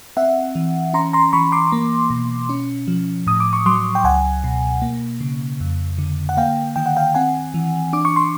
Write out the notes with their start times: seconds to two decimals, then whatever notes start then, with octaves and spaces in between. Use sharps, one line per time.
0.17 C4 E5 F#5
0.55 E3
0.94 C#4 A#5 C6
1.13 A#5 C6
1.33 E3 B5 C#6
1.52 C6 D6
1.72 A#3
2.10 B2
2.49 C#4
2.88 F3
3.27 A2 D#6
3.40 D6
3.53 C#6
3.66 F#3 C6 D6
3.95 G5
4.04 C#2 F#5 G#5
4.44 B2
4.82 A#3
5.21 C#3
5.60 F2
5.98 D3
6.29 F#5
6.37 A#3 F5 G5
6.76 D#3 G5
6.86 F#5
6.97 F5 G5
7.15 C4 F#5 G#5
7.54 E3
7.93 D4 D6
8.05 C#6
8.16 C6